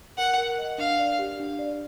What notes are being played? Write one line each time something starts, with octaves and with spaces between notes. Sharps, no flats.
A#4 F#5
A#4
D#5
D4 F5
D5
G4
D4
D5